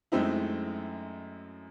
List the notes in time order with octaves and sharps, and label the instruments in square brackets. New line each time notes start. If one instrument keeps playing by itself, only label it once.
[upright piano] F#2 G#3 A3 C4 D#4 E4